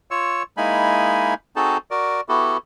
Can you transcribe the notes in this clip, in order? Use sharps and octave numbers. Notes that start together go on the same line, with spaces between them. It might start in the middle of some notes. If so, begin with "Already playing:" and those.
F4 C#5 C#6 E6
G#3 A#3 D#4 E4 G#5 B5
C4 D#4 F#4 G#4 A4 A5
F#4 A#4 D5
B3 E4 F#4 G4 A4